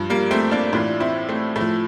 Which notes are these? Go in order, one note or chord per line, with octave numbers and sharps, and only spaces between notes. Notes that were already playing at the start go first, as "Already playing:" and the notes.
Already playing: G2 F3
G3 A#3
A3 C4
A#3 D4
A2 E3 D4 F4
C4 E4
A3 C4
A2 F3 A3